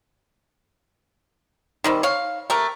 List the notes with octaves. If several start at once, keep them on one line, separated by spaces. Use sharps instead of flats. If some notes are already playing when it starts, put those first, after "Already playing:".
D#3 G3 C4
C#5 F5
A3 G4 A#4